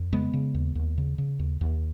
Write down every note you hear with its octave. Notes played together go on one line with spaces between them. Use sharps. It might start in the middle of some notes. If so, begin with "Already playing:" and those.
Already playing: F2
C#3 G#3 B3
C#3
D#2
D#2
C#3
C#3
D#2
D#2